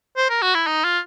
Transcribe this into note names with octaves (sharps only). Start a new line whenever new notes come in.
C5
A#4
F#4
E4
D#4
F4